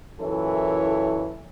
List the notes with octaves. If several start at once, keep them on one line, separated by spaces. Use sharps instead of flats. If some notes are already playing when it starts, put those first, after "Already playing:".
F#2 A#2 E3 E4 A4 C#5